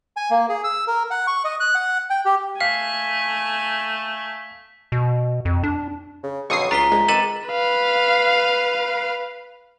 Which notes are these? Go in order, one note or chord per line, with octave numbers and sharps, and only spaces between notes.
G#5
A#3
G#4
E6
A#4
F#5
C#6
D#5
F#6
F#5
G5
G4
A3 F5 G#5 B6 C7
B2
F2
D4
C#3
B1 F2 D3 F#3 C#6 D#6 C7
C#2 D4 F4 A#5 B6 G7
A#1 G#3
C3 D#3 A4 B4 A6 E7 F#7
B4 F5